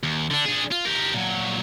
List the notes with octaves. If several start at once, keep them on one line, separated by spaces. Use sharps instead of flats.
D#2
D3 D4
D4 G#4
F4
G4 A#4
A#2 F#3